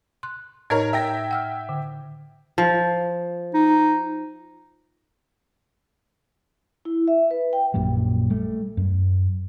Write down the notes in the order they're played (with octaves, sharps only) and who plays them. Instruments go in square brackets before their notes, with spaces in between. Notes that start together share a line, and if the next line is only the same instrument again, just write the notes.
[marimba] C6 F#6
[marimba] A2 D#4 D#5 [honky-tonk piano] A#4 C#5 G#6
[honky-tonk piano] E5 G5 A#6
[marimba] F#5 E6 F6
D3
[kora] F3
[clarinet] D#4
[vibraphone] E4
E5
B4
G5
[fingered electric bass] A#1 F#2 A#2 G3
G3 A3
F#2